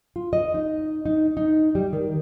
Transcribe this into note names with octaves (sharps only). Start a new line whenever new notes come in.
F4
D#5
D#4
D#4
D#4
G3
D#3